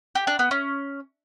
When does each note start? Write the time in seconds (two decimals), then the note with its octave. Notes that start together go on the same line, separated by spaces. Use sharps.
0.15 G4
0.27 D4
0.39 B3
0.51 C#4